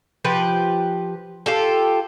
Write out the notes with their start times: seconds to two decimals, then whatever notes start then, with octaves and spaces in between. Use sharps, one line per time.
0.25 F3 G4 B4
1.46 F4 G4 A4